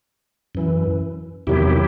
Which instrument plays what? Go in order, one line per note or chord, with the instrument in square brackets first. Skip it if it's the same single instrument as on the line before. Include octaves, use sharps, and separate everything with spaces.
[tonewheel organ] F#2 E3
E2 C3 D#3 F#3 E4 G4